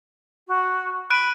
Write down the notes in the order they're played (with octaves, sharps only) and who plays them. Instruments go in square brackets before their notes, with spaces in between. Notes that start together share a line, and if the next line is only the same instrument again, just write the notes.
[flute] F#4
[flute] B5 [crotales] F#6 D7 D#7